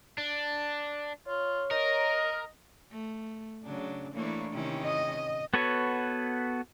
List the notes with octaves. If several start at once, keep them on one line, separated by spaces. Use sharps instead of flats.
D4
F4 C#5
A#4 D#5
A3
C#3 F#3 D4
E3 A3 A#3 D4 E4 C#5
C3 D#3 C#4 E4
D#5
B3 F#4 A4 B4 C#5